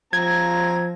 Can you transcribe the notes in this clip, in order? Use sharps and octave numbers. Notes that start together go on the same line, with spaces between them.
F3 C4 A#5 G#6